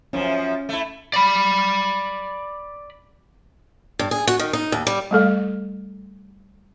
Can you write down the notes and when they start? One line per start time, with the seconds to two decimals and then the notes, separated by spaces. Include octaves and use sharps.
0.13 F#2 F3 C#4
0.69 A3 E4
1.14 D5 B5
3.99 G2
4.11 G#4
4.27 F#4
4.39 D#3
4.53 D#4
4.72 D#2
4.87 G3
5.11 G3 A3 A4 F5